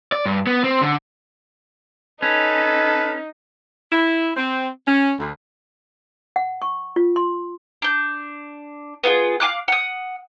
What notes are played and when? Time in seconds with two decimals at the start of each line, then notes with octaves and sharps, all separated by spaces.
0.12 D5
0.26 G2
0.47 B3
0.64 C4
0.81 D3
2.22 C#4 D#4 A4 B4
3.92 E4
4.36 C4
4.87 C#4
5.20 D2
6.36 F#5
6.62 C#6
6.96 F4
7.16 C6
7.82 D4 G6
9.04 B3 F4 F#4 G#4
9.40 F5 G#5 D6 F#6
9.68 F#5 D#6